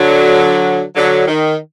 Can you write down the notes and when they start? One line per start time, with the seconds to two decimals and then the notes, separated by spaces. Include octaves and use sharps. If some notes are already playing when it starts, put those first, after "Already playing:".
Already playing: D3 F#3
0.96 D3 F#3
1.27 D#3